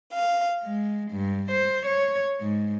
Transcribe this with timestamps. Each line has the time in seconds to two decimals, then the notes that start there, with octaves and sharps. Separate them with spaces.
0.12 F5
0.64 G#3
1.12 G2
1.52 C5
1.85 C#5
2.41 G#2